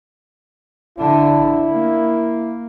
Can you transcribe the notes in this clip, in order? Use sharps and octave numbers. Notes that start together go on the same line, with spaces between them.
D3 D4 E4
A#3